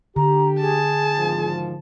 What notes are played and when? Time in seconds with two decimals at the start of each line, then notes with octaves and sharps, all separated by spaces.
0.16 D3 G4 A#5
0.61 G#4 A5
1.18 G#1 G#2 F3